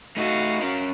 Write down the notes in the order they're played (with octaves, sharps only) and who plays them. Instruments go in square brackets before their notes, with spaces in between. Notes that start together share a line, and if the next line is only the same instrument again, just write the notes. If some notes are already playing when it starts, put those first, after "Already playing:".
[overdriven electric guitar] A3 D#4 [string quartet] F#4 F5
[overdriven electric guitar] C#4 A#4